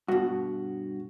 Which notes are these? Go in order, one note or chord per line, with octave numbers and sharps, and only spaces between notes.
G2 B2 F#4